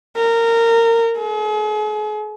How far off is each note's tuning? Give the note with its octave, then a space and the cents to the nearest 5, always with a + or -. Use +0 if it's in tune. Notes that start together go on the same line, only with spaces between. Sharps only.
A#4 -20
G#4 +40